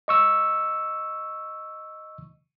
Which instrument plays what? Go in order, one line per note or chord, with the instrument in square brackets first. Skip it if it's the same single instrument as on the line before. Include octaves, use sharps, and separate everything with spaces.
[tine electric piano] D#5 C#6 E6